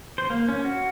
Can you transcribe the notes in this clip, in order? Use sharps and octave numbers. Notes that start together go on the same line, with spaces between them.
C5
A#3
C#4
F#4